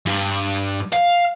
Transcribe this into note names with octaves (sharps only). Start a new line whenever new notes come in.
G2
F5